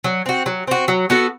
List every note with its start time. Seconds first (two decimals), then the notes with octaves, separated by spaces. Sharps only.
0.04 F#3
0.26 C4 F#4
0.46 F#3
0.67 C4 F#4
0.88 F#3
1.10 B3 F#4 A4